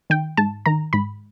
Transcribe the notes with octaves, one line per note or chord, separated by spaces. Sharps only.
D#3 G5
G#2 A5
D#3 A#5
G#2 B5